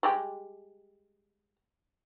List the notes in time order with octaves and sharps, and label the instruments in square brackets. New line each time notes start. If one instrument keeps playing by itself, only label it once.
[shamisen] G3 G#3 G4